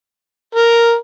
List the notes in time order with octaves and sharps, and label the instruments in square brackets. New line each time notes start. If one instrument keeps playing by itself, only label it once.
[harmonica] A#4